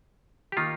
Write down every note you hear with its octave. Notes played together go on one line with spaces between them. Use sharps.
G4
D#3 A#3 D#4 F4